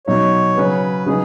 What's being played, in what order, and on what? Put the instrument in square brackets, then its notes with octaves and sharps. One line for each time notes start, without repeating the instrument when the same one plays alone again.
[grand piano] B2 F#3 D#4 [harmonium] C#5
[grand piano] C#3 F#3 C#4 [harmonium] B4
[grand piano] C#3 F#3 D#4 [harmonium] G#4